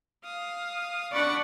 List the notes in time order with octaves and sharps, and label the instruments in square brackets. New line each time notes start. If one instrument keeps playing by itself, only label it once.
[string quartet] F5 D#6
[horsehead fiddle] D4 D5 [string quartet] F#5 B5 C#6